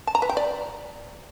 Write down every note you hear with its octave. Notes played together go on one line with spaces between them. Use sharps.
A5
A#5
B4
G5
D5